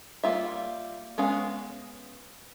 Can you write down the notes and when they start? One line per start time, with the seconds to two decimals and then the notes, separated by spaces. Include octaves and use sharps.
0.23 G3 A#3 F4 E5
1.18 G#3 B3 C#4 F5